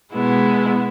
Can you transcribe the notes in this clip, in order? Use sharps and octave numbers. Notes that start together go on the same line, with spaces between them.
B2 G#3 B3 E4